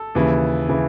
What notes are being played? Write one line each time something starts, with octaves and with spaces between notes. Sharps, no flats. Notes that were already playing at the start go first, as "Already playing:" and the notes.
Already playing: A4
D#2 C#3 E3
C#3 E3